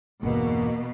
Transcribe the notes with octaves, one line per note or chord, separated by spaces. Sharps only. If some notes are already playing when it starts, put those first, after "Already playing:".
G1 E2 B2 A#3